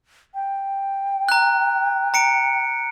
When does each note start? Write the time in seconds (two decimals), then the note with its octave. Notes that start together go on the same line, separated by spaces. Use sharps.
0.34 G5
1.29 A#5 F#6
2.14 A#5 C#7 D7